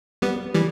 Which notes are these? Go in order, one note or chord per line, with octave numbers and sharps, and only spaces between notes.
G3 B3
E3 G3